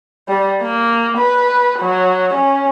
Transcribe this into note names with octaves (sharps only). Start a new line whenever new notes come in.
G3
A#3
B4
F#3
C#4